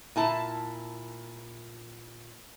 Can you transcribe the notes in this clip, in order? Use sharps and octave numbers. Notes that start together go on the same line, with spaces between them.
A#2 E4 A5